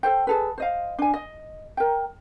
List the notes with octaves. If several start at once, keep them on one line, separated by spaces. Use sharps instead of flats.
A4 C5 G5
G#4 A4 B4
C5 D#5 F5
D4 G#5
D#5
A#4 G5